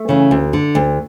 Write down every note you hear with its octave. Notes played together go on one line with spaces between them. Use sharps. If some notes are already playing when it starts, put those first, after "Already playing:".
Already playing: A3
C#3 E3
D2
D3
D2